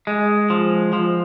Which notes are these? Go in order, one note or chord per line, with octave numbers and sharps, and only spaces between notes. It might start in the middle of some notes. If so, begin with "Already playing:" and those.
G#3
F3
F3